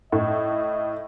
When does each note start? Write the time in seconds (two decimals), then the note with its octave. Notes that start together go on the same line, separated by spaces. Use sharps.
0.12 A2 D#5